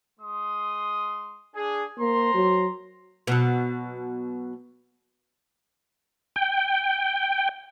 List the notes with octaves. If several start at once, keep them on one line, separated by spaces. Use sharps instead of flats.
G#3 C6 D#6
D4 G#4
A#3 C5 A#5 C6
F#3
B2 F#3
G5